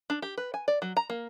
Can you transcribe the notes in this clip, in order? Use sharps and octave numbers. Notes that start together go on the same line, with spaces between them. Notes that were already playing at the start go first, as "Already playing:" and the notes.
D4
G4
B4
G#5
D5
F#3
A#5
A#3